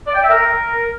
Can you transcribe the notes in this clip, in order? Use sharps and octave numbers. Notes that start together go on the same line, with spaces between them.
D5
G5
E5
A#4